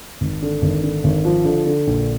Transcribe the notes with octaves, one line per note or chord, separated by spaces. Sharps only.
G#1
D3
G#1
D3
G#1
F3
D3
D3
A#1